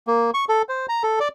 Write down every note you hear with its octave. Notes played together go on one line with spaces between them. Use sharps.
A#3
C#6
A4
C5
A#5
A4
D5